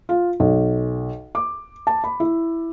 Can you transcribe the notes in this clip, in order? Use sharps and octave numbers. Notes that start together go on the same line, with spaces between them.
F4
B1
D6
A5
B5
E4